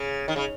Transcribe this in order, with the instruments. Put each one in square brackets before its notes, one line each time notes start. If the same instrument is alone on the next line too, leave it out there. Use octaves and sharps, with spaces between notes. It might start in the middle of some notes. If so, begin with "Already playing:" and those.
Already playing: [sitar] C#3
D#3
C#3